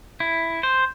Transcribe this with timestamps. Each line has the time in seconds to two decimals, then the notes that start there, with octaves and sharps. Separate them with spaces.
0.20 E4
0.63 C5